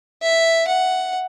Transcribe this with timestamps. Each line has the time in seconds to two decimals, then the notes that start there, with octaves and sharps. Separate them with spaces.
0.22 E5
0.67 F#5